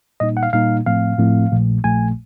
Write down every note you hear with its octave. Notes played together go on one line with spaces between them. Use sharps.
A#2 G3 A#3 D#4 D#5
F#5
F5
A#2 G3 A#3 D#4 F5
A2 F3 A3 C4 F5
A2 F3 A3 C4
A#1 A#2 F3 A3
A#1 A#2 F3 A3 G#5